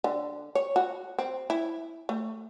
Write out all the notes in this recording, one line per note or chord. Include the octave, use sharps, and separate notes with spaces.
D3
C#5
F#4
C4
E4
A3